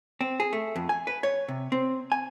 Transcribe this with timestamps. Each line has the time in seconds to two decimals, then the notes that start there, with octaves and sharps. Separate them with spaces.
0.21 C4
0.40 G#4
0.53 A3
0.76 F2
0.89 G#5
1.07 B4
1.23 C#5
1.48 C3
1.72 C4
2.12 G#5